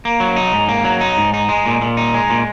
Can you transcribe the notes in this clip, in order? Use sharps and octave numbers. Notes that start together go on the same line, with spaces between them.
A#3
F#3
D#4
G#2
A#3
F#3
D#4
G#2
D#4
G#3
A#2
A#2
D#4
G#3
A#2